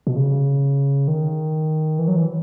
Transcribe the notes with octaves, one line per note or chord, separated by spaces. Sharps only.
B2
C#3
D#3
E3
F#3
E3